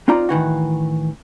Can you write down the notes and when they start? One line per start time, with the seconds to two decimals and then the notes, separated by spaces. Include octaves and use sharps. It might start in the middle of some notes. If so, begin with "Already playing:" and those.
0.08 C4 D#4 F4 D5 A#5
0.29 A2 D#3 E3 F#4